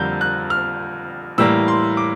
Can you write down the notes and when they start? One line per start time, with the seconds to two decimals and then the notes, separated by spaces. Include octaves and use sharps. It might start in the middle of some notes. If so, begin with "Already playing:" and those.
Already playing: F2 D3 G3 A#3 G6
0.21 F#6
0.50 F6
1.38 A2 E3 G3 A#3 E6
1.68 C6
1.97 D6